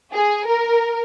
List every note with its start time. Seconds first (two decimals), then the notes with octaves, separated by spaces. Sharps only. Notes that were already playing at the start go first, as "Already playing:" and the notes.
0.14 G#4
0.47 A#4